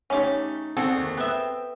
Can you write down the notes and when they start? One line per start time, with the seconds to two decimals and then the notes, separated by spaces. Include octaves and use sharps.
0.10 C#3 A3 C#4 D#4 G4
0.77 C4 F#4 G#4 A4
0.97 D#2
1.17 B3 E5 G5